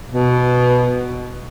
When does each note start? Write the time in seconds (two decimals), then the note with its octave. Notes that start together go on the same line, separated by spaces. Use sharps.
0.11 B2